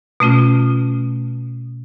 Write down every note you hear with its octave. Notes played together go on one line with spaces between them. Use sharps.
B2 A3 C#4 F4